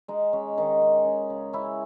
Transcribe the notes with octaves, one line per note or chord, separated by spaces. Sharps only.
G#3 D#4
G#3 C#4
D#3 D#4
C#4
C#4
C#3
C#4 E4